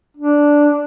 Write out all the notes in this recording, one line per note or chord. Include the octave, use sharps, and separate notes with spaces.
D4